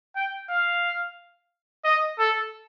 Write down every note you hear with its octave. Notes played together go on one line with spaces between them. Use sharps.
G5
F5
D#5
A4